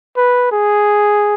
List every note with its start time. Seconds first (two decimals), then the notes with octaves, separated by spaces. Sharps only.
0.17 B4
0.52 G#4